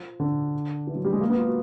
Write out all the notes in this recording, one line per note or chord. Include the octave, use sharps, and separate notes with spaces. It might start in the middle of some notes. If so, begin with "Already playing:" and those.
Already playing: F3
D3
E3
F#3
G3
G#3
A#3
B3
F4
F#4